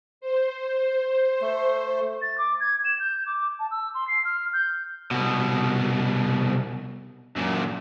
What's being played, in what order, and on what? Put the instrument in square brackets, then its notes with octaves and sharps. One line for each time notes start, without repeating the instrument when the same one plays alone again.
[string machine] C5
[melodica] A3
[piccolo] A6
D6
G#6
E7
G6
D6
A5
E6
C6
C7
F6
G6
[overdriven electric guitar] C2 B2
F#2 A#2